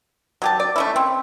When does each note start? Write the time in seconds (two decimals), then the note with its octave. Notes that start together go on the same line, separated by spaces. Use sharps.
0.42 F#3 G4 A5
0.60 D5
0.76 A3 C#4 E4
0.96 C4